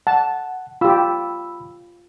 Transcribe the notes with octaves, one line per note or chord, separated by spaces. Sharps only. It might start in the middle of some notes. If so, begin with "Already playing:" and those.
F#5 A5
F4 G4 B5 E6